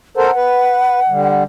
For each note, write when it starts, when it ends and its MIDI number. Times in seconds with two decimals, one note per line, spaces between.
0.17 0.31 69
0.17 0.31 70
0.17 0.31 72
0.17 1.43 78
0.36 1.00 71
1.09 1.44 50
1.09 1.44 55